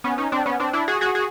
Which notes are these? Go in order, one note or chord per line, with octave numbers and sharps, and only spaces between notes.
B3 C#4
C#4 D#4
C4 D4
B3 C#4
C4 D4
D4 E4
F#4 G#4
F#4 G#4
F#4 G#4